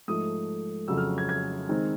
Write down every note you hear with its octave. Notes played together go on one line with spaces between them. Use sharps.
G#2 F3 A3 D#6
F2 C#3 F#3 E6
F6
G#6
G#6
D#3 G#3 C4 D#4